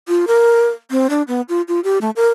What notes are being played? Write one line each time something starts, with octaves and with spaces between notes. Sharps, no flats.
F4
A#4
C4
D4
B3
F4
F4
G4
A3
A#4